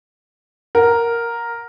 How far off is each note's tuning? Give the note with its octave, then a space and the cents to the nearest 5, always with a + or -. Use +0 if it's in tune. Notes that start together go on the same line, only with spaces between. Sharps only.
A#4 +0 F#5 +0